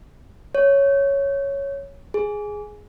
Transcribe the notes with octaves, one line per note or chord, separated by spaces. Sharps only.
C#5
G#4